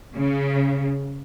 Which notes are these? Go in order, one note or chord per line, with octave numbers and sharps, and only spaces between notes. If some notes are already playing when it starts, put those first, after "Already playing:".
C#3